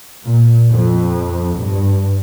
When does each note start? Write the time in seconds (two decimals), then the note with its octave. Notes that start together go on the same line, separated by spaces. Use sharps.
0.24 A#2
0.71 F2
1.57 G2